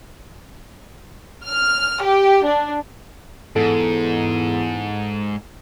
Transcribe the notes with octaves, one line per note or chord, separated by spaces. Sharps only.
F6
G4
D4
E2 G#2 A4